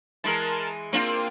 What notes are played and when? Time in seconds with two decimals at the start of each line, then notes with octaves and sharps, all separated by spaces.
0.24 E3 G#3 A#4 A5
0.93 A#3 C4 D4 F4